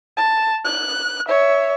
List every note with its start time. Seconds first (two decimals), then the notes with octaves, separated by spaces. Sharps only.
0.17 A5
0.65 F#6
1.28 C#5 E5